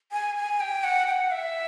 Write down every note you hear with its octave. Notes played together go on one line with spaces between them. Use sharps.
G#5
G#5
G5
F#5
G5
F#5
E5